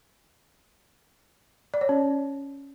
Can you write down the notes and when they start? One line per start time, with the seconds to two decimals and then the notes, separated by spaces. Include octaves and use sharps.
1.74 D5
1.81 C#5
1.89 C#4